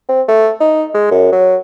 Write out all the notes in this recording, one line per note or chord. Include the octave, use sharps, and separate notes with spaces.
C4
A3
D#4
G#3
F#2
F#3